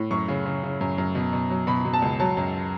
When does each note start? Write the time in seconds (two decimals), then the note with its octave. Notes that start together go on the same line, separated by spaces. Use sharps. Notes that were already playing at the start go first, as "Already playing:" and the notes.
Already playing: A2
0.11 F#2 C#6
0.28 C#3
0.46 C#3
0.63 C#3
0.81 F#2
0.98 F#2
1.15 B2
1.33 B2
1.50 F#3
1.67 B2 B5
1.85 B2
1.93 A5
2.02 C#2
2.20 F#3 A5
2.37 F#2